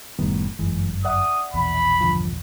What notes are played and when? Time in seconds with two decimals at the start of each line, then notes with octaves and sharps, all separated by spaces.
0.19 F#1 A2 D#3 G3 B3
0.59 G1 F#2 E3 G#3
1.05 D5 E5 F#5 D#6
1.54 A#1 E2 B2 B5
2.01 G2 D3 F3